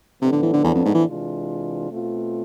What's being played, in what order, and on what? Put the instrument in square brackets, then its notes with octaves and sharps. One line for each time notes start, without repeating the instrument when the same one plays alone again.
[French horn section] A2 F3 B3 D4 A4 [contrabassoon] C3
[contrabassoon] D3
E3
D3
E2
F2
G#2
E3
[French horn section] C3 E3 G#3 D4 F4
B2 A3 C4 F4